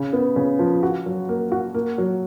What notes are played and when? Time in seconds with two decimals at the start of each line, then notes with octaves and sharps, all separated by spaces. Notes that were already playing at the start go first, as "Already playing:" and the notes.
Already playing: C#3
0.13 B3
0.36 C#3
0.59 F3
0.83 F#4
1.06 F#3
1.29 A#3
1.52 F#4
1.74 A#3
1.98 F#3